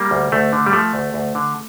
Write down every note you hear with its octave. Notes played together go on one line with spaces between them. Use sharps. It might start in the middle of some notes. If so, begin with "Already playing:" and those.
Already playing: G3 A#3
D2
D2 A3
D3
G3
F3 A3
D2
D2
D3